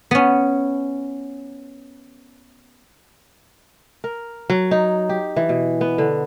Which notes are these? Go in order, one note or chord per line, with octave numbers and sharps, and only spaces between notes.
B3 C#4
A#4
F#3
D#4
G4
E3
B2
B3
D3